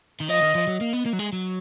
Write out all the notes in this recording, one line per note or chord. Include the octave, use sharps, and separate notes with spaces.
D#3
F3 D#5
D#3
F3
F#3
A#3
B3
A#3
F#3
G#3
F#3